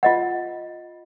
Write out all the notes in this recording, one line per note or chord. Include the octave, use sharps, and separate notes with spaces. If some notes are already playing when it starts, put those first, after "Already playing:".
F4 D#5 F#5